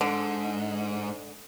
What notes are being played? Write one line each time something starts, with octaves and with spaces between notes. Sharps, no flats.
G#2 D3